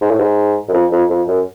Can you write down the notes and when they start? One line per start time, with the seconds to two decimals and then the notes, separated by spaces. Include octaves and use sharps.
0.02 G#2
0.11 A2
0.20 G#2
0.69 F#2
0.73 F2
0.92 F2
1.10 F2
1.28 F#2